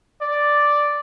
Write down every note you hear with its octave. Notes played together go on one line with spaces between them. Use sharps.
D5